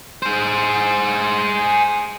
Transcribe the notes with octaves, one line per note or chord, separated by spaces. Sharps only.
G#4 C5